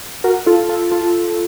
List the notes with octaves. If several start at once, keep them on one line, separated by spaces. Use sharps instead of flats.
F#4 A#4
F4 A4
F4 A4
F4 A4